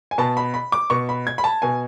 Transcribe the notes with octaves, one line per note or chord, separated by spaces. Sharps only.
G#5
B2 A5
B5
B5
D6
B2 C#6
B5
G#6
B5
A5
B2 G#5